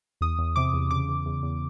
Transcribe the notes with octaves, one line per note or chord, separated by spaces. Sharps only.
E2 D#6
E2
C3 D6
E2
C#3 D6
E2
E2
E2